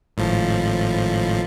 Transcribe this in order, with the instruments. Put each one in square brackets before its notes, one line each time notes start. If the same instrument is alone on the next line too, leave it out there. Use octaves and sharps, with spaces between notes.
[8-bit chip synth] G#1 A2 F3